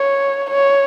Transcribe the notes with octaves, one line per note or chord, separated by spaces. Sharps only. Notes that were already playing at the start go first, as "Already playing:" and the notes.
Already playing: C#5
C#5